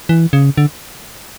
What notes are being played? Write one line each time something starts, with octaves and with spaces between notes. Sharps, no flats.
E3
C#3
D3